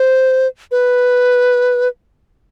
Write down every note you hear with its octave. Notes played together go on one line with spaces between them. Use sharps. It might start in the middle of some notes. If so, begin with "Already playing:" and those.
Already playing: C5
B4